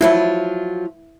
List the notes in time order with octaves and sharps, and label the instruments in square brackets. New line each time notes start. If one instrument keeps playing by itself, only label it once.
[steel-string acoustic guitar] F3 F#3 F4 [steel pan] E4